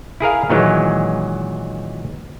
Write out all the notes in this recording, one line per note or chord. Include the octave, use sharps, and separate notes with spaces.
E4 G#4 A#4 F5
A#2 D#3 E3 F#3 G#3